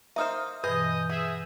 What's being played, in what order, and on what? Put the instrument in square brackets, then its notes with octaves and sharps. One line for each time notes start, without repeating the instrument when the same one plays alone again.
[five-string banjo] A#3 D#4 C5 [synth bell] E5 D#6 F6
[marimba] G2 B2 E3 [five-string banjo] G#4 [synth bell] B4 G6 [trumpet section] D#5 D#6
[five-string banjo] B3 [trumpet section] G#4 E5